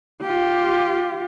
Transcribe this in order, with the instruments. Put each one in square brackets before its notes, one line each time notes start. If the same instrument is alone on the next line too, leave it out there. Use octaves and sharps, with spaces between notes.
[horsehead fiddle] F4 G4